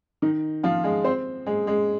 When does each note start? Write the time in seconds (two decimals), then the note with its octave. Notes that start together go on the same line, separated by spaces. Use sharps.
0.22 D#3 D#4
0.63 F3 F4
0.83 G#3 G#4
1.04 C4 C5
1.46 G#3 G#4
1.67 G#3 G#4